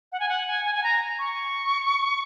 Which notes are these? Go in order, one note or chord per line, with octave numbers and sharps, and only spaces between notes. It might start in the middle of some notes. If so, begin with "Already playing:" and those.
F#5
G#5
F#5
G#5
G#5
G#5
A#5
C#6